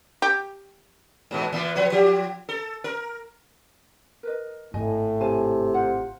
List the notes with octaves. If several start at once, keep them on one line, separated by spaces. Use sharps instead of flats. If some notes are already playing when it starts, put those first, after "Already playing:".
G4
G#2 B2 E3
A#2 E3 B3
F3 B4 C#5
F3 G4
A4
A#4
A#4 B4 D#5
G#1 A2 D#5 G#5
C3 F5 G#5 A5
F4 C5 F#5